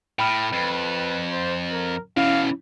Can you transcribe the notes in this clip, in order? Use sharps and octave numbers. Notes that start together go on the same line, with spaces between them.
A2 G5 B5 F6
F2 B4
C5
A#4
B2 E3 C#4 E4 F5